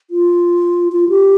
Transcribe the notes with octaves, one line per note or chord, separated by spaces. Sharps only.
F4
F4
G4